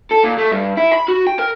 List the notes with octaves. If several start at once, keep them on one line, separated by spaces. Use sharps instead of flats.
A4
A#2
A3
G2
E4
B5
F#4
G5
A#4